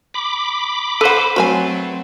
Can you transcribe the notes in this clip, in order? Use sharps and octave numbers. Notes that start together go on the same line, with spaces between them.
B5 D6
A4 B4 C5 F#5
F#3 A3 C4 F#4 C#5 G#5